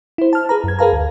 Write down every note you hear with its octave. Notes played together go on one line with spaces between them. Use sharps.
E4 C5
A5 F6
G#4 B4 A#5
F#2 G#6
G#4 A#4 B4 F5 A5 A#5
D2